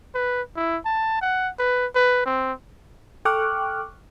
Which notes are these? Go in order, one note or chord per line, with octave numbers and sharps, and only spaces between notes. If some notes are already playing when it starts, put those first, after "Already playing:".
B4
E4
A5
F#5
B4
B4
C4
A4 G5 C#6 D6 F6 F#6